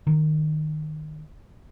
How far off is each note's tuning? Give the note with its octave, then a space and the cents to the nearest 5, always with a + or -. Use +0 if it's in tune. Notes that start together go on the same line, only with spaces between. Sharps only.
D#3 -20